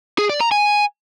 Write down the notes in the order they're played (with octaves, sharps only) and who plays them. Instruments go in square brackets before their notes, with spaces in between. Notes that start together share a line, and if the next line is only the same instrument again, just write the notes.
[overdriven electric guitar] G#4
D5
A#5
G#5